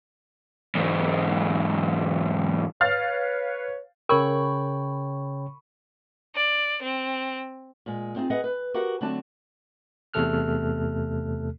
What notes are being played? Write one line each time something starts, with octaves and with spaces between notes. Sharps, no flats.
E2 G#2
B4 C#5 F5 F6 A6
C#3 A#4 C#5 G5 B5 C#6
D5
C4
A#2 G#3
C4 D#4 F4 G#4
G#4 B4 D#5 F#5
B4
F#4 G4 A#4 F5 F#5
D3 F#3 A3 C4 D4 A5
E2 C3 A3 A4 F6 F#6